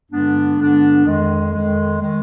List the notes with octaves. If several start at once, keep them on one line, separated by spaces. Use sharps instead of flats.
G2 D3 G#3 B3 D4
G2 D3 G#3 B3 D4
F2 D#3 G#3
F2 D#3 G#3
D#3 G#3